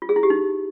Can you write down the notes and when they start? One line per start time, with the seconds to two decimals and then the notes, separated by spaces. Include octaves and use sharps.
0.02 F4
0.09 G#4
0.16 E4
0.23 G4
0.30 D#4